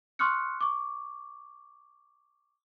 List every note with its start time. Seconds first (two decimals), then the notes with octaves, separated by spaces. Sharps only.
0.19 C6 C#6 D#6 F6 F#6 C#7
0.61 C#6 D6